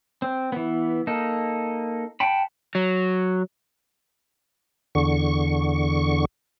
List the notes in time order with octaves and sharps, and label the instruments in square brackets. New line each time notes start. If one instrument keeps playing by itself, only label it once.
[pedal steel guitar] C4
E3 B3
A#3 D#4 A4
F#5 G5 A5 B5
[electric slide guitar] F#3
[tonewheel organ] E2 D3 C#6